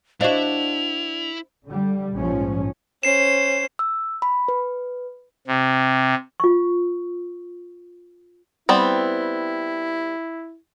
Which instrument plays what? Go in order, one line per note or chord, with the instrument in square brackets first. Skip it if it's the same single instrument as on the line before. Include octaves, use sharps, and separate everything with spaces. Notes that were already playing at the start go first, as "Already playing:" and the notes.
[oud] D4 F#4 [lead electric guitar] E4 [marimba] C5 D#5 F5 [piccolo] F7
[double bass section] D3 G3
A#1 G#2 F3 C#4
[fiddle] C#4 C5 [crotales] C7 E7
[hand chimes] E6
B5
B4
[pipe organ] C3
[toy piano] F4 C#6
[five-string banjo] G3 B3 C4 [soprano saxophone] E4